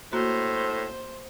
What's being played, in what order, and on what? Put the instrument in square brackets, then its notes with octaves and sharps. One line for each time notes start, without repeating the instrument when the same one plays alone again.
[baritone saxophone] A2 [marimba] A#3 F#4 [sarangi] C5